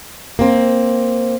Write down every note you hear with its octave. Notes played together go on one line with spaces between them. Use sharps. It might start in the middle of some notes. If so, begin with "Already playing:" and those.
A#3 C4